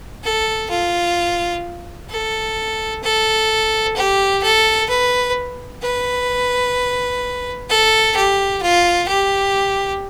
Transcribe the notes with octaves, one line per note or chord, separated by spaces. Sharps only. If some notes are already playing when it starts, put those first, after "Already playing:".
A4
F4
A4
A4
G4
A4
B4
B4
A4
G4
F4
G4